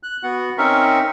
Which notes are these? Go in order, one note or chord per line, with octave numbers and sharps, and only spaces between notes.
F#6
B3 F#4 F#5
C4 C#4 D#4 A#4 E5 C#6